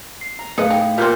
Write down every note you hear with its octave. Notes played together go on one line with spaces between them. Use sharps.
C7
A#5
A2 G#4 B4 D#5 F5 C#7
D#4 F5 G5
A#2 G3 B3 C4 G6